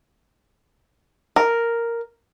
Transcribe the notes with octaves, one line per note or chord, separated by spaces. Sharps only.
A#4